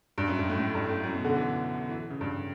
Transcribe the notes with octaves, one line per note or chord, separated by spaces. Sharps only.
G2
F#2
G2
A2
A2
G2
A2
F#2
B2
D3
E3
E3
C#3
G2